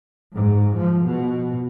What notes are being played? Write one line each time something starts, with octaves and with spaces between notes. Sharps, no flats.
G#2
F3
B2